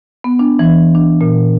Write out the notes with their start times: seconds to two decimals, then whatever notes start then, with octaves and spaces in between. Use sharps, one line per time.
0.24 B3
0.39 D4
0.59 E3
0.95 D4
1.21 A#2